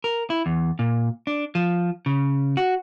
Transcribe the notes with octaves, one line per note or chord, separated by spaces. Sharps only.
A#4
E4
E2
A#2
D4
F3
C#3
F#4